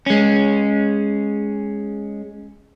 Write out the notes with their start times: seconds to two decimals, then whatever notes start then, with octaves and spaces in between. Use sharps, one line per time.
0.06 G#3 C#4